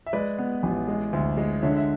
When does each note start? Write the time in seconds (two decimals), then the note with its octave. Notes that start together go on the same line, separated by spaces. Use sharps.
0.06 E5
0.13 G#3 B4 D5
0.38 B3
0.63 A1
0.88 G#3
1.13 D2
1.37 G#3
1.63 D3 C#5 E5
1.76 E5